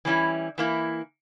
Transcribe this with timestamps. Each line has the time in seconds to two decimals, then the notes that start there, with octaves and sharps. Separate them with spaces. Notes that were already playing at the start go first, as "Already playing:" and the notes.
0.05 E3 G3 C#4 E4
0.58 E3 A#3 E4